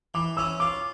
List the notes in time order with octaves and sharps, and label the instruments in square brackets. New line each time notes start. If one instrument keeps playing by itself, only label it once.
[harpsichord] E3 [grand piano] D6
[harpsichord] C#4 [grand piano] E6
[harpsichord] F4 [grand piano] D6